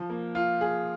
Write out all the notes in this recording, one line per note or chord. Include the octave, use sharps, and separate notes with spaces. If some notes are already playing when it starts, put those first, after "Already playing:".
Already playing: F3
A#3
F4
G#4